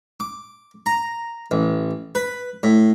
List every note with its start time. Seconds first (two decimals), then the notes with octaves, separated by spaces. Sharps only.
0.20 D6
0.86 A#5
1.51 A1
2.15 B4
2.63 A2